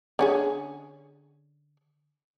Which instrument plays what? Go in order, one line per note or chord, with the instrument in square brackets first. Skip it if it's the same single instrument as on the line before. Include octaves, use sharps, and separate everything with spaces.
[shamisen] D3 C#4 G#4